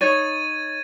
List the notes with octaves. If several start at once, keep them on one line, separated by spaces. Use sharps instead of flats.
D#4 C#5 G#6 A6 D#7